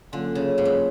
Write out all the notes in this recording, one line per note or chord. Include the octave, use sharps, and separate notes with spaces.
D3 F#3 A#3 C#4 F4
C#3
G#2
G2